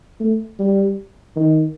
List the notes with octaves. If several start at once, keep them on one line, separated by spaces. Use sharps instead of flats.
A3
G3
D#3